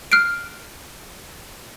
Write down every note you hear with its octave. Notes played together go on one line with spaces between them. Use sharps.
F6 F#6 C7 D7